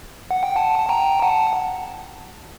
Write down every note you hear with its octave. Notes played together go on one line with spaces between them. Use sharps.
F#5
G5
F#5 A5
A5
G5 A#5
F#5 A5